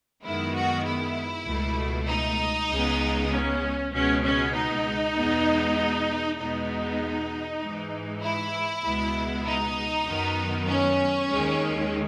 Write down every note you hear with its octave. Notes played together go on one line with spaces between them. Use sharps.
F#2 D#3 G#3 B3 E4
F#4
E4
C#2 B2 A3
D#4
C#2 C#3 G#3 B3
C#4
C#2 B2 G#3 B3 C#4
C#4
D#4
E2 B2 G#3 B3
E2 B2 G#3 B3 D#4
G#2 E3 G#3
E4
C#2 B2 G#3 B3
D#4
F#2 D#3 F#3 B3
C#4
D#2 D#3 G#3